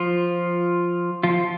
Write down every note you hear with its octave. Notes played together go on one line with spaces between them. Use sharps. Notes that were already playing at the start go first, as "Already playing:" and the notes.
Already playing: F3 F4
F3 F4